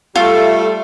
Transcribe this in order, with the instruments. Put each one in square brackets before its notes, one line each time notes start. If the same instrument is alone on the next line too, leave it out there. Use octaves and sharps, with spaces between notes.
[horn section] G3 A3 [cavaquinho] F4